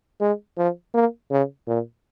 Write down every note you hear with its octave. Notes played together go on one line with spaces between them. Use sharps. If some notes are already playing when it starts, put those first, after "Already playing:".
G#3
F3
A#3
C#3
A#2